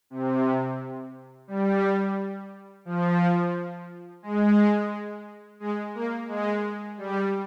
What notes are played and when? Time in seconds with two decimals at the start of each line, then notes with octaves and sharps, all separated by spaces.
0.10 C3
1.48 G3
2.85 F3
4.23 G#3
5.60 G#3
5.95 A#3
6.28 G#3
6.98 G3